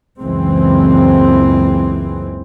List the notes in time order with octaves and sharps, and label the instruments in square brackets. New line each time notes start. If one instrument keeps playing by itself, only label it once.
[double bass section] F#1 C#2 E3 G#3 C4